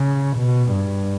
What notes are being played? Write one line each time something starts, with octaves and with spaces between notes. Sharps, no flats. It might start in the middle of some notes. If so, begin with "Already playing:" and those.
Already playing: C#3
B2
G2